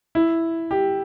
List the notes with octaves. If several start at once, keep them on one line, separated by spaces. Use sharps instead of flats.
E4
G4